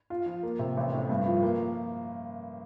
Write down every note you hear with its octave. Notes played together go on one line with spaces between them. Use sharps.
F4
F3
A#3
C3
A1
A2
G2
F3
A#3